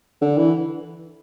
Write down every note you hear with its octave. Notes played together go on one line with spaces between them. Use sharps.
D3
E3